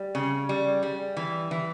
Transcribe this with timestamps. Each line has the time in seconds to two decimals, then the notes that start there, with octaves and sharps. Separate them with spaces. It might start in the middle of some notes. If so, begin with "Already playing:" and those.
Already playing: G3
0.15 C#3
0.49 G3
0.83 G3
1.17 E3
1.51 E3